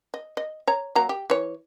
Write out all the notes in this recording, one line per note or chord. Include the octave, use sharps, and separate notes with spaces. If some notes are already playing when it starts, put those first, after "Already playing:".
D#5
D#5
C#5 A#5
F#3 A#3 A#5
G4
E3 C#5